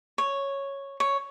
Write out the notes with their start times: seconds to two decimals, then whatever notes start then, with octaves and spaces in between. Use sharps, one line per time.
0.18 C#5
1.00 C#5